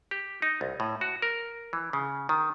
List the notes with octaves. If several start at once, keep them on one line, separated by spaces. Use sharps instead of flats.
G4
D#4
C2
A2
F#4
A#4
E3
C#3
D#3